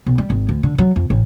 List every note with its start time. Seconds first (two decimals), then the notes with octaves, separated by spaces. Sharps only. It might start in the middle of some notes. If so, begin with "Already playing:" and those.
0.06 B1
0.18 G3
0.30 G#1
0.49 D2
0.63 D3
0.78 F#3
0.96 F2
1.10 A1